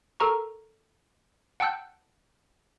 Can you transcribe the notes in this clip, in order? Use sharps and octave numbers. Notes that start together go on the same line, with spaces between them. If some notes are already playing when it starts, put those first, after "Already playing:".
A4 A#4 A#5 C#6
F#5 G5 A5 E6 F#6 G6